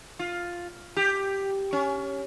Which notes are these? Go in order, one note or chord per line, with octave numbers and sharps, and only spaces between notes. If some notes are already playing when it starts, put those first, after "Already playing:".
F4
G4
C#4